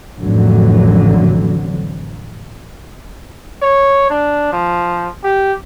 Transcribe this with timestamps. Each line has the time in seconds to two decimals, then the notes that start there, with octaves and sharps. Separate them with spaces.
0.19 A1 F2 D3 F#3
3.62 C#5
4.10 D4
4.53 F3
5.24 G4